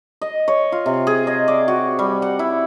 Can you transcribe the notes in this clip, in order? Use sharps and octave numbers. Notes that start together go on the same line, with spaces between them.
D#5
C#5
F4
C3
G#4
D#5
D5
F#4
G3
F#5
E4